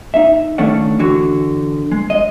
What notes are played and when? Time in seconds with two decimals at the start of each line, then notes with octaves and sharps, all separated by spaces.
0.14 D#4 E5
0.58 C#2 D#3 A3 C#4 D4 F#5
0.99 D3 E3 F#4
1.92 G#3
2.10 D#5